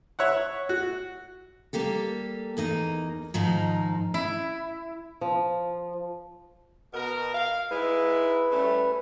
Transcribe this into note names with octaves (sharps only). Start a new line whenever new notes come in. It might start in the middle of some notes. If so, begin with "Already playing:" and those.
C#5 E5 F#5
F#4
G3 A#3 G4 A4
E2 A#3 D#4 D#5
G#2 D#3 F3 D#4
E4
F3
B2 A#4
F5
G#2 G#3 E4 B4
G3 A3 C#4